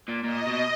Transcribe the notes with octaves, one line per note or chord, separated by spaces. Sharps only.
A#2
A#2 D#5
B2